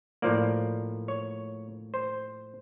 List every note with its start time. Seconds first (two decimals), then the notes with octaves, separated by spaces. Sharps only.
0.22 A2 F3 A#3 D5
1.08 C#5
1.94 C5